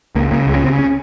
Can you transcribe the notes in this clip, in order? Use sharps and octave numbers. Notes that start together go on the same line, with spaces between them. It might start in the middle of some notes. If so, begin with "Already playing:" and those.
C#2 A#3
C#3 A#3
C#2 G#3
C#4
C#3 C4
C#4